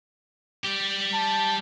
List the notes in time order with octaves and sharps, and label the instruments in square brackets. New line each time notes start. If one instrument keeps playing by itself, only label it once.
[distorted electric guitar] G3 G4
[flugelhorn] A5